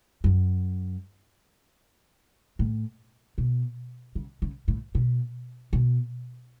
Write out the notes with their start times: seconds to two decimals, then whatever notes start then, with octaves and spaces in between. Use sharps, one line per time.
0.24 F#2
2.59 A2
3.38 B2
4.15 C#3
4.42 C#3
4.68 A2
4.95 B2
5.73 B2